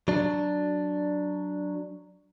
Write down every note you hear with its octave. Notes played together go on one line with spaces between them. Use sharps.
F#3 D4